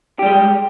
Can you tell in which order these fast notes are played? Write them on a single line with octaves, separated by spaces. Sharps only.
G4 G3 G#3